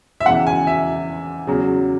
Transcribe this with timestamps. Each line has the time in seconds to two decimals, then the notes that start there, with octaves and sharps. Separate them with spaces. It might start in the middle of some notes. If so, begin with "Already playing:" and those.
0.21 E5
0.26 E2 C#3 E3 F#5
0.47 G#5
0.67 E5
1.47 E2 C#3 F#3